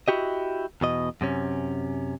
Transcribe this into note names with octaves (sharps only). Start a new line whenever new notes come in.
E4 F#4 G4 D#5
E2 B2 D#5
F#2 C3 C#4